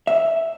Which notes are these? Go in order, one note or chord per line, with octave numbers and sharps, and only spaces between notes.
E5